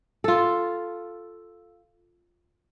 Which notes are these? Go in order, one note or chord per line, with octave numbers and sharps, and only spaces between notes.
F4 A4